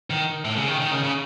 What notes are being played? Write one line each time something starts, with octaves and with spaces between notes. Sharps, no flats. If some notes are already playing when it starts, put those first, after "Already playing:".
D#3
A2
C#3
D#3
D#3
C#3
C#3